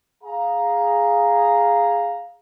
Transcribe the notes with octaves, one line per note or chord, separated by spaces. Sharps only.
G#4 F5 A#5